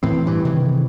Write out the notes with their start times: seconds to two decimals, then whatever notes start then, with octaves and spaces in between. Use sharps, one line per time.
0.03 A2 E3 C4
0.26 G2 E3
0.45 C3 D#3 E3